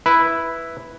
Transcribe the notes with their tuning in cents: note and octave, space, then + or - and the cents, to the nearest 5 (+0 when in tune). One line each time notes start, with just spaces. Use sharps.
E4 +0 B4 +0